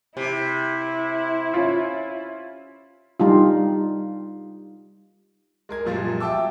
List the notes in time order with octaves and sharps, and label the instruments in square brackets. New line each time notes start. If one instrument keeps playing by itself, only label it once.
[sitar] C3 [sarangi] E4
[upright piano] C#4 F4
[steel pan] G3 D#4 F4
[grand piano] G#3 A#4 G#6
F#2 A#2 F3 G3 G#3
E5 G5 A5 D6 E6